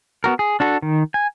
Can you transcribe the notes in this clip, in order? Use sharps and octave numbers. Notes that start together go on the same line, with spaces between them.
B3 F#4 A#4
G#4
D4 F#4 A4
D#3
G#5